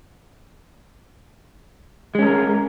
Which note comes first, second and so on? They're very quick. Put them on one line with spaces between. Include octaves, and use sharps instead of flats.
G#3 C#4 A4 A#4